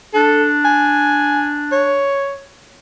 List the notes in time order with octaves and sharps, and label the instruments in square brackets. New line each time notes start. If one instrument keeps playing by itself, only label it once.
[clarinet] D4 [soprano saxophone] A4
[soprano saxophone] G#5
C#5